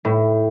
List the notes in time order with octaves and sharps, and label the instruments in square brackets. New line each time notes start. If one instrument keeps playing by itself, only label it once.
[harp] A2